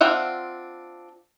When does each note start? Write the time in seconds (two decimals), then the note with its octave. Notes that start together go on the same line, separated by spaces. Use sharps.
0.01 C4 D4 F4 E5 F#5